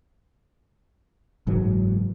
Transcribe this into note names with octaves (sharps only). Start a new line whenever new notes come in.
F#1 G#2 E3 F#3